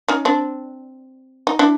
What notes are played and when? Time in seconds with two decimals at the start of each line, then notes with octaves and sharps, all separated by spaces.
0.08 C#4 D#4
0.25 C4 D4
1.47 D#4
1.59 D4 E4